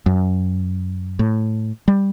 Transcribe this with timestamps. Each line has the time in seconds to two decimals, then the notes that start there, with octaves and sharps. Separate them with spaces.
0.06 F#2
1.19 A2
1.88 G3